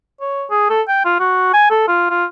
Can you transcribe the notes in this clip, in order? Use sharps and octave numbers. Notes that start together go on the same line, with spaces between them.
C#5
G#4
A4
G5
F4
F#4
G#5
A4
F4
F4